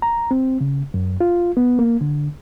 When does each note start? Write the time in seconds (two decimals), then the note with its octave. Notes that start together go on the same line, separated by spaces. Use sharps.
0.02 A#5
0.31 C4
0.61 C#3
0.94 F#2
1.21 F4
1.57 B3
1.79 A#3
2.01 D3